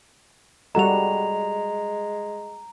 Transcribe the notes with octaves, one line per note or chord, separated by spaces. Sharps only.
G3 G#3 F#4 A4 A#5 F7